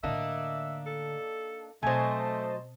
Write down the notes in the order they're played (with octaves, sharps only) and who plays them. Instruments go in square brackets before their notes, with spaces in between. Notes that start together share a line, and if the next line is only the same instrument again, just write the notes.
[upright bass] A2 D3 [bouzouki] A#3 D4 D#4 [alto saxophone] E5
[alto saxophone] A4
[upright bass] B2 C4 [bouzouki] F#3 G#5 [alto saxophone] A3 [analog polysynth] C5 D#5 A5